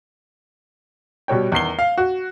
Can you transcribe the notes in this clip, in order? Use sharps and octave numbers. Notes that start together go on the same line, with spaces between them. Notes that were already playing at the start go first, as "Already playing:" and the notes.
B2 G3 C#5 G5
E2 D#3 C7 G7
F5
F#4